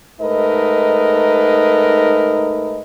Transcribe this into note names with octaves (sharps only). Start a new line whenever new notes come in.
G#2 A3 D#4 A#4 B4 D#5